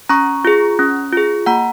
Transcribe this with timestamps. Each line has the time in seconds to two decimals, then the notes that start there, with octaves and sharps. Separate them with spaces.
0.09 C#4 A#5 C#6
0.45 F4 G#4
0.79 C#4
1.13 F4 G#4
1.46 A#3 F#5 A#5